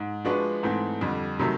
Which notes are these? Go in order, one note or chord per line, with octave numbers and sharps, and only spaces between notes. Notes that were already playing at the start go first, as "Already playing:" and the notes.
Already playing: G#2
F3 G#3 B3 D4 F#4
G#2 E3 A3 C4
F2 D3 G3
C3 D#3 F#3 A3